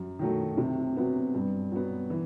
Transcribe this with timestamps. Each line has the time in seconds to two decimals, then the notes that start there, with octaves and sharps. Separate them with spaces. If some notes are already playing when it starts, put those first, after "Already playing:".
Already playing: F#2
0.19 D#3 F#3 A3
0.57 C3
0.97 F#3 B3
1.34 G2
1.72 F#3 B3
2.10 E3